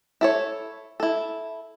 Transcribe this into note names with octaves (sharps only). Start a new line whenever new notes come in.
E4 A4 C#5
E4 A4